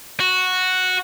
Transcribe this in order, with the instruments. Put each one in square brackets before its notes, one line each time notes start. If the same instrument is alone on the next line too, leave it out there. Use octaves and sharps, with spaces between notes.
[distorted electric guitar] F#4